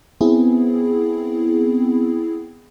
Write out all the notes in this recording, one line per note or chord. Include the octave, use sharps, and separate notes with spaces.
B3 C4 E4 G#4